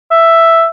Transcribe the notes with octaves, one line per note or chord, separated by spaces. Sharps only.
E5